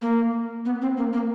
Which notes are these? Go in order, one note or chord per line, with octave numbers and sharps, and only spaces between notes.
A#3
B3
C4
A#3
A#3